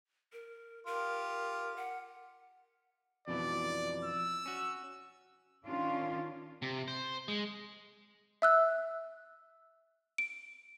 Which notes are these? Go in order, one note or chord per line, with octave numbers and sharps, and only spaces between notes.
A#4
F4 G4 A#4
F#5
F2 B2 E3 D5
E6
C#4 F#4
D#3 C#4 D4 F4
C3
C5
G#3
E5 E6 F#6
D7